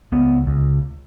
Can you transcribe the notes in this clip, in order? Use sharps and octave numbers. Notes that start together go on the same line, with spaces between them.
C#2 B3
C#2